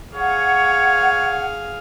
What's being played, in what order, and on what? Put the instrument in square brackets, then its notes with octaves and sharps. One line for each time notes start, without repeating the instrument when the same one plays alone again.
[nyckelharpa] G#4 F5 [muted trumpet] C#5 [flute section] F#5